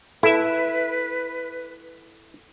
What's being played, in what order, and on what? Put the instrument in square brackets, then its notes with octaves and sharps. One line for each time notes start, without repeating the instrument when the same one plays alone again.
[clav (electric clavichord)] E4 E5 [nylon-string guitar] A4 [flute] B4